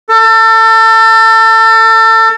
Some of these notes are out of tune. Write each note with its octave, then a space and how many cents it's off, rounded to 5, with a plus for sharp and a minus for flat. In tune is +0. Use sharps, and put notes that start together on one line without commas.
A4 +30